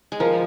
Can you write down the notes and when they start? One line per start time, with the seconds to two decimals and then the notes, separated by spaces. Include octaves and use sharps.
0.12 G#3
0.20 F3 A#4